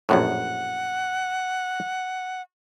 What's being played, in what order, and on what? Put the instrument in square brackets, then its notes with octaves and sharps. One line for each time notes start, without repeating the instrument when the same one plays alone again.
[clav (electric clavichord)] A#1 F#2 A2 [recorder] F#5